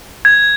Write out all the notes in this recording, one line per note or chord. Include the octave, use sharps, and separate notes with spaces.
G#6